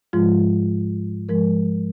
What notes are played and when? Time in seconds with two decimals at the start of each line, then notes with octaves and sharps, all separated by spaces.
0.13 G#2 F3 G#3 F4
1.29 G#2 F3 G#3 A#4